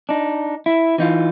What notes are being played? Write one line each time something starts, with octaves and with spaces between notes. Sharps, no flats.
D4 D#4
E4
E3 D#4 F4